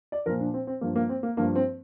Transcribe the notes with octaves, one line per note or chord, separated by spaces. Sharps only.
D5
A#2 F3 A#4
D4
C4
C4
G2 F3 A#3
A#3
C4
A#3
G2 F3 A#3
C4